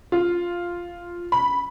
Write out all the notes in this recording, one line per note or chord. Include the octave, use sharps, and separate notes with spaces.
F4
B5